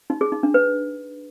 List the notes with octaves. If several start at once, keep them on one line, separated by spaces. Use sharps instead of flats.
D#4
G#4
D#4
D4
B4